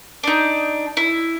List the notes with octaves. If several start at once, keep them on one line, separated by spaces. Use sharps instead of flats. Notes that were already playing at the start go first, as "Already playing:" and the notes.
D4 D#4
E4